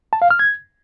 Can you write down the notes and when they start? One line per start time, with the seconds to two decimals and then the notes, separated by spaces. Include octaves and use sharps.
0.13 A5
0.22 F5
0.30 F6
0.39 G#6